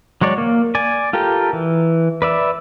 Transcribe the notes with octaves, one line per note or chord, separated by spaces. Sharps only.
F#3 G#3 C#5 D5
A#3
D5 G#5
F4 G4 A4 A#4 G5
E3
B4 D5 E5